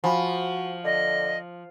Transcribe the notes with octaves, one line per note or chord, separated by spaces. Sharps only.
F3 F#4 F5 G#5 B5
D3 D#5